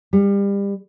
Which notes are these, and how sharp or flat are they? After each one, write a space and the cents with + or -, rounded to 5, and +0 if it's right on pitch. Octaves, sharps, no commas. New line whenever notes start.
G3 +30